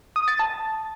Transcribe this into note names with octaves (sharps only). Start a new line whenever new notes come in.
D#6
A6
A5